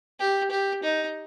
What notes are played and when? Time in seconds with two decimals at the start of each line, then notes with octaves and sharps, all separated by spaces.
0.20 G4
0.51 G4
0.83 D#4